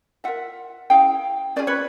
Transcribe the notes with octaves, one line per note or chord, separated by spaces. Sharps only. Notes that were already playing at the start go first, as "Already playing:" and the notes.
F4 A#4 E5 F#5
C#4 E4 G#4 F5 G5
C#4 F4 G#4 C5 D5
B4 C#5